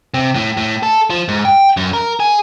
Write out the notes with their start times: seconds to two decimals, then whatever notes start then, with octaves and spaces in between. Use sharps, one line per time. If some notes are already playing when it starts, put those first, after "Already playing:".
0.14 C3
0.35 A2
0.57 A2
0.83 A4
1.10 F3
1.28 G#2
1.45 G5
1.77 F#2
1.93 A#4
2.20 G#4